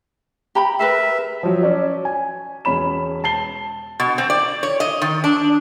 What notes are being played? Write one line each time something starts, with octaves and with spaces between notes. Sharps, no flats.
G4 A#5 B5
G#4 A#4 B4 E5
F3 F#3
C#4 D5
G#5
E1 C#4 B5 E7
A5 C7 G7
B2
C4
D5
C#5
D#5
D#3
D4